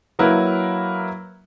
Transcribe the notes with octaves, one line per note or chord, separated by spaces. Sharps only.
F#3 A#3 E4 A#4 B4